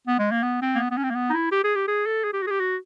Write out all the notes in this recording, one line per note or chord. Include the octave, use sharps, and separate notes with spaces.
B3
G#3
A#3
B3
C4
A#3
B3
B3
C#4
C4
A#3
B3
D#4
E4
G4
G#4
G4
G#4
A4
G#4
G4
F#4
G#4
G4
F#4